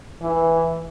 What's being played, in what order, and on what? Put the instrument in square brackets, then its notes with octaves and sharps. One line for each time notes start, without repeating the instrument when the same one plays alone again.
[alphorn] E3